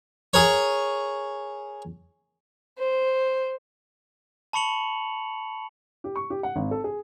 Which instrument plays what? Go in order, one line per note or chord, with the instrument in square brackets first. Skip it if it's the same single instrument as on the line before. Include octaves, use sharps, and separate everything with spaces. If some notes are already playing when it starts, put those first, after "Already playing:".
[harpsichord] G#4 A#4 C#5
[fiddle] C5
[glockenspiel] A5 B5 C#6 C#7 F7 F#7
[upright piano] G4
C#6
G4
F#5
G#1
A4
G#4